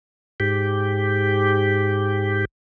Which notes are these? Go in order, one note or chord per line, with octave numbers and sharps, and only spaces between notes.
G#2 G4